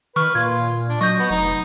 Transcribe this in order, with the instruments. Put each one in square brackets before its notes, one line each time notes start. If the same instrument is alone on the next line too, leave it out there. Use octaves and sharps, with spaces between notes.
[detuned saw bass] D#3 [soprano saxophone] B4 [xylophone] C#6 F6
[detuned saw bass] A#2 [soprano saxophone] F4 [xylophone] G#6
[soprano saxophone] D4
[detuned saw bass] F#3 [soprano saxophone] D#5 [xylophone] C#6 G6
[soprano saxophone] B3
[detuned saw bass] F1 [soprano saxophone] D#4